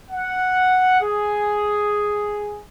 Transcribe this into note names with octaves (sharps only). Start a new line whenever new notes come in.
F#5
G#4